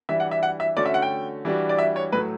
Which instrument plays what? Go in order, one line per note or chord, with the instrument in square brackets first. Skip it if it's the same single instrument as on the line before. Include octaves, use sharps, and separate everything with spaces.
[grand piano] E3 G3 D4 [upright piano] E5
[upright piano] F#5
E5
F#5
E5
[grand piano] D3 A3 C#4 F#4 [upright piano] D5
[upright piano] E5
F#5
G5
[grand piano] E3 G3 D4 F#4
[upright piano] D5
E5
C#5
[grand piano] A2 F#3 A3 [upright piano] B4